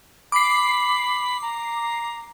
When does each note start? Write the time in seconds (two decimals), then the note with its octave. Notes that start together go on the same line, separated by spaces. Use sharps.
0.32 B5 D6 C7
1.42 A#5